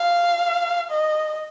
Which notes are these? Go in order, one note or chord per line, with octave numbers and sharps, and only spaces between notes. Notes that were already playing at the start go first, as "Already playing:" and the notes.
Already playing: F5
D#5